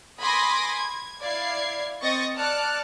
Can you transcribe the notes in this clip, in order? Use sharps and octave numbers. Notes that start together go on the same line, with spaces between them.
G#5 B5 C6 D6 D#6 A#6
G#6
E4 D5 F5 G#6 C7
C4 D#5 C#6 D#6 A6 A#6
D5 A5 D6 F6 F#6 C#7